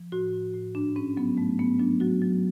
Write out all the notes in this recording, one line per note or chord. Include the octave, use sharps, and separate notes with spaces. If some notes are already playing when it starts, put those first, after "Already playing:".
Already playing: F3
A2 F#4
A2
A2
G#2 D4
G#2 C#4
F#3 B3
G#2 A3
G#2 B3
F#3 D4
F#3 F#4
F#3